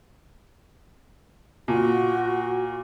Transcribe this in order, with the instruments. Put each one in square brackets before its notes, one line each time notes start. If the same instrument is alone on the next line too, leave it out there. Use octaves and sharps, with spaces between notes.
[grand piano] A#2 [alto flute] F#4